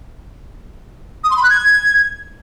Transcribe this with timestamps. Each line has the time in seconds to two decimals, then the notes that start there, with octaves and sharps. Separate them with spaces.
1.24 D#6
1.30 C6
1.37 B5
1.43 F#6
1.50 G#6